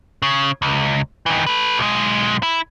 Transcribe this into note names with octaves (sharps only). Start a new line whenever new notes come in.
C#3
C#2
D#3 E3
A4 B4
B1 G#3
E4